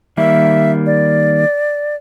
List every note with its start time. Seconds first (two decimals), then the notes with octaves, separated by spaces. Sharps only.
0.17 D#3 G3 A#3 E5
0.86 D5